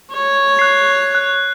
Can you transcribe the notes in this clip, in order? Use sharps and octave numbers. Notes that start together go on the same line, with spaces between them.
C#5
F#6 C7
F#6